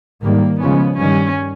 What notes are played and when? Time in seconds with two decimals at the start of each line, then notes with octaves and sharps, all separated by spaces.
0.23 G#2 D#3 G3 A#3
0.60 C#3 F3 G#3 B3 C#4
0.97 G2 D#3 G3 C#4